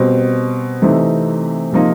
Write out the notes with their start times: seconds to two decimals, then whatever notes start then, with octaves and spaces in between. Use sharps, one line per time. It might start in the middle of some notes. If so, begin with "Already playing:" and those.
Already playing: B2 G3 C4
0.82 C3 E3 A3 C4 D#4
1.72 C3 F3 A#3 D#4